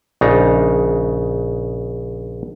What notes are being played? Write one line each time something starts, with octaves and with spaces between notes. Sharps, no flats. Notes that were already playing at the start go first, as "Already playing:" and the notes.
A#1 C#3 D4 D#4 A#5